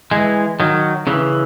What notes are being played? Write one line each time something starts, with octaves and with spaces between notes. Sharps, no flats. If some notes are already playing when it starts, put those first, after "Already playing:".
E3 G#3
D#3 F#3
C#3 E3